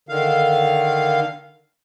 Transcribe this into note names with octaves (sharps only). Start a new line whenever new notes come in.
D3 D#3 F5